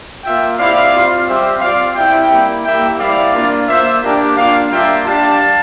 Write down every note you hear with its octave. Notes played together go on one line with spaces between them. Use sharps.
A#3 F4 E5 G5
C4 E4 G4 D5 F5
C4 F4
G3 C4 G4 C5 E5
C4 F4 D5 F5
C4 E4 G4 E5 G5
G3 A#3 E4
A#3 E4 G4 E5 G5
G3 C4 E4 D5 F5
A#3 D4 F4
A#3 F4 C5 E5
A#3 D4 G4
A#3 D4 F4 D5 F5
G3 A#3 D4 F4 E5 G5
G3 D4 G4 F5 A5